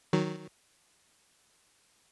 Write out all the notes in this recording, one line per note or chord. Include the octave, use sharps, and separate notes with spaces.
D#3 F#3